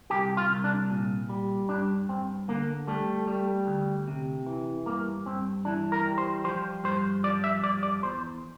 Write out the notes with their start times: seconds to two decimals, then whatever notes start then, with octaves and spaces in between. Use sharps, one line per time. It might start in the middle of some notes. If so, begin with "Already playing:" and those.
0.10 C2 G4
0.37 F4
0.51 C2
0.64 D4
0.90 A#2
1.29 G3
1.69 G2 D4
2.09 G2 C4
2.48 D3 A#3
2.87 G3 A3
3.27 G3
3.67 D2
4.08 C3
4.46 E3
4.86 G2 A#3
5.26 G2 C4
5.65 E3 D4
5.92 A#4
6.06 G3
6.18 C5
6.44 F3 C5
6.84 G2 C5
7.24 F3 D5
7.44 E5
7.63 G2 D5
7.83 D5
8.02 E2 C5